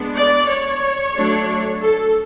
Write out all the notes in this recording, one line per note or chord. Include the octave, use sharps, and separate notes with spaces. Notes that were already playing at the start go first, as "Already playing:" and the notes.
Already playing: G#3 B3 D4
D5
C#5
F#3 A3 D4
A4